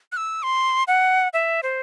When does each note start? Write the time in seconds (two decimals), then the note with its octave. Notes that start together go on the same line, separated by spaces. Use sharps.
0.12 F#6
0.17 E6
0.43 C6
0.88 F#5
1.34 E5
1.63 C5